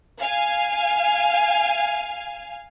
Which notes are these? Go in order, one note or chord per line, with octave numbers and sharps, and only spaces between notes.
F5 G#5